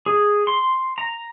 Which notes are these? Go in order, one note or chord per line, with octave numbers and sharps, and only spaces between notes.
G#4
C6
A#5